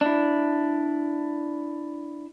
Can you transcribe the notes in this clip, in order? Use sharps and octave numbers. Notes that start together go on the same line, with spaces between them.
D4 E4